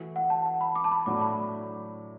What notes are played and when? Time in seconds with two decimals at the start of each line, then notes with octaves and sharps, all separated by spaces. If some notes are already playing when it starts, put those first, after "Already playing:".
Already playing: E3 A3 F#4
0.16 F#5
0.30 A5
0.46 F#5
0.61 B5
0.76 D6
0.84 A5
0.92 B5
1.06 A2 F#3 D4 F#4 D6
1.21 B5